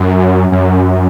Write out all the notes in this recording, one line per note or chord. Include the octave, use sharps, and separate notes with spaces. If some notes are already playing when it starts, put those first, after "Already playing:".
Already playing: F#2
F#2